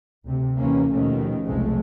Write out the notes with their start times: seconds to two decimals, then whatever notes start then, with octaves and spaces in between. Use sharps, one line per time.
0.25 D2 C3
0.58 D#2 C3 E3 A#3 C#4
0.92 D#2 B2 D#3 F3 A3 C#4
1.45 F1 B1 E2 F3 G#3 A3